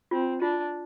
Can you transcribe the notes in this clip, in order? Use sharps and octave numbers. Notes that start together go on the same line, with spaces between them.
C4 F4
D4 F4